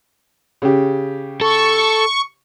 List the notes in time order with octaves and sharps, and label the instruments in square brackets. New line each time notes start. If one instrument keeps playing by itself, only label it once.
[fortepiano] C#3 G4
[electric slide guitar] A4 [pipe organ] C#6